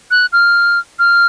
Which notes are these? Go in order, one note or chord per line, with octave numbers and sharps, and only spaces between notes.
F#6
F6
F6